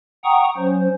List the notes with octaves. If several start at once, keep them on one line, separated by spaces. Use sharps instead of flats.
F#5 G5 A#5 C#6 D#6
F#3 C#4 C5